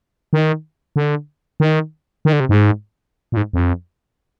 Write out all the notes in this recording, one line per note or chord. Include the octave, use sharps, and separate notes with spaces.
D#3
D3
D#3
D#3
D3
C3
G#2
A#2
G#2
F2